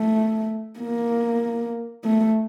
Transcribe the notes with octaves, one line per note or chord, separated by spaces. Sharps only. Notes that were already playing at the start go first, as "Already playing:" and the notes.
Already playing: A3
A#3
A3